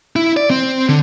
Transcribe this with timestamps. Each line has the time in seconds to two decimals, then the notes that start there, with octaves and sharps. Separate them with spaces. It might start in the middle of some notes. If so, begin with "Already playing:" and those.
0.16 E4
0.37 D5
0.51 C4
0.89 D3